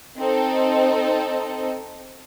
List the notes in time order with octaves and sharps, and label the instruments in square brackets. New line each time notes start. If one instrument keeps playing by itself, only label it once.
[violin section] C4 D#4 A4